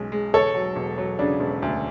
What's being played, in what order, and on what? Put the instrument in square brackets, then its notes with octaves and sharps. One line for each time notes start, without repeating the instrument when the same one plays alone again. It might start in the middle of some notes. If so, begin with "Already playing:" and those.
Already playing: [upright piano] B1 G#3 C#4
G#3
[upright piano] E1 [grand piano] A4 C#5
[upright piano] F#3
E1
F#3
[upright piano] C#3 [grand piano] D4
[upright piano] E1
D2